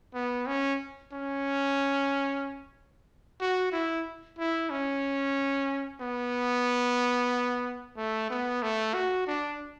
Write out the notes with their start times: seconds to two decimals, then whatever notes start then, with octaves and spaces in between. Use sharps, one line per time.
0.14 B3
0.47 C#4
1.12 C#4
3.41 F#4
3.72 E4
4.39 E4
4.70 C#4
6.01 B3
7.97 A3
8.30 B3
8.62 A3
8.94 F#4
9.27 D4